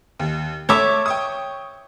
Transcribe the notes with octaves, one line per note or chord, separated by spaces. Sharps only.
D#2
A3 C#5 E5 A5 D6
G5 C#6 D#6